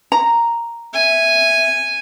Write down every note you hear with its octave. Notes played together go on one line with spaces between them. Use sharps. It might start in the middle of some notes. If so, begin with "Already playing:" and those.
A#5
E5 G#5